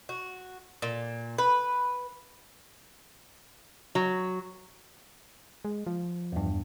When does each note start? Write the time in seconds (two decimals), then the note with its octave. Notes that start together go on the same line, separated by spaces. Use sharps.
0.09 F#4
0.82 A#2
1.38 B4
3.95 F#3
5.65 G#3
5.87 F3
6.32 E2 G2